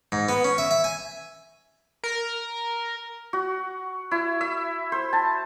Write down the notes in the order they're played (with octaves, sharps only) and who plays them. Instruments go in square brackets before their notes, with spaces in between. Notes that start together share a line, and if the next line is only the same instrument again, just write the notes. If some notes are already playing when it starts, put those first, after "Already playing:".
[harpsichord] G#2
B3
C#4
E5
E5
G#5
[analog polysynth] A#4
[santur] F#4
E4
E5
C5
A5